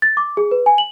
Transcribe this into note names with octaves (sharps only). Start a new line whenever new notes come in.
A6
D6
G#4
B4
G#5
F#7